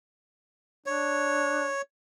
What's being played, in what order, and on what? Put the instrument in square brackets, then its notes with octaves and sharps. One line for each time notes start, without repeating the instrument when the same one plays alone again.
[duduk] D4 [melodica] C#5